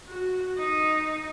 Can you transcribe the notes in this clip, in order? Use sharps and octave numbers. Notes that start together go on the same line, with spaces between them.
F#4
D#4